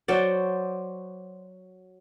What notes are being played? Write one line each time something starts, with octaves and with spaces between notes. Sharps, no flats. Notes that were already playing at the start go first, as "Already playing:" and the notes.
F#3 C5 D5